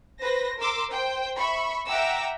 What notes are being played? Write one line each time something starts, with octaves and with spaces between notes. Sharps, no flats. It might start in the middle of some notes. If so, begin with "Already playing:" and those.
B4 C5 A#6
A#4 C6 D6 E6
C5 G5
E5 B5 C#6
E5 F#5 G5 A#5 D6 E6